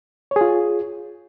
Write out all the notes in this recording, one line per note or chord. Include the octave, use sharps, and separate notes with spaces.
F4 G#4 C#5